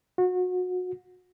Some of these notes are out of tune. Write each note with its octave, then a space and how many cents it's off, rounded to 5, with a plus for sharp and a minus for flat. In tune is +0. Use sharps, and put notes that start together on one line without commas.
F#4 -30